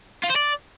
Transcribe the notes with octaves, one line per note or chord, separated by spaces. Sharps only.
F4
C5
D5